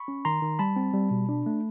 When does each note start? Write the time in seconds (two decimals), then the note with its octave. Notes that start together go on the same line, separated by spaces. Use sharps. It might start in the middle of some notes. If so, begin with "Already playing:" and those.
Already playing: B5 C#6
0.08 C#4
0.25 D#3 A#5 C6
0.42 D#3
0.59 G3 A5 B5
0.76 C4
0.94 G3
1.11 B2
1.29 D4
1.46 A3